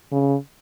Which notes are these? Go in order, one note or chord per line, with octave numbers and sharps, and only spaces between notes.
C#3